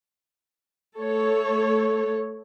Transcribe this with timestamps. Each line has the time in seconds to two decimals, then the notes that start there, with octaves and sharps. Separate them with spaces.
0.97 A3 A4 C#5